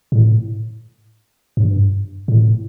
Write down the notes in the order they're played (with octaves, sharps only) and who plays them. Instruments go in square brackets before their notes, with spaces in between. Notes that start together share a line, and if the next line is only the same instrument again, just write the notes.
[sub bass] A2
G2
A2